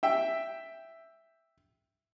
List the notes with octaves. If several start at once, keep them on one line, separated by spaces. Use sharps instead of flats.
E5 G5